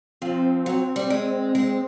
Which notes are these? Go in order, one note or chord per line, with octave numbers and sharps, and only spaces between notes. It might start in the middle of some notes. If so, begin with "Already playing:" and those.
F3 C4
F#3
G3
G#3
G#3